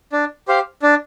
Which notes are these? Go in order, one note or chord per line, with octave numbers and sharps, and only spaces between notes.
D4
G4 C5 F5
D4